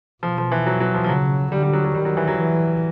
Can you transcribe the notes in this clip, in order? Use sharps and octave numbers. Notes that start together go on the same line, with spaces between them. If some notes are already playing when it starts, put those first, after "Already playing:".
B2 F3
F3
E3
F#3
F#3
F3
F3
C#3 F#3
D3 G3
G3
F#3
F#3
D#3 G3
F#3
E3
F#3
E3